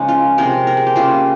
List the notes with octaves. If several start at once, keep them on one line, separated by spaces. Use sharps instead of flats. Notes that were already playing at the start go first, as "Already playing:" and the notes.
Already playing: C#3 F3 G#3 C#4 D#4
F4
C3 F3 G#3 A#4
A#4
G#4
G4
C#3 G3 A#3 F4